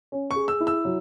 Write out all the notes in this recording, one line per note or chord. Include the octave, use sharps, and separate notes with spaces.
C#4
C#6
G#4
E6
E4
E6
F#3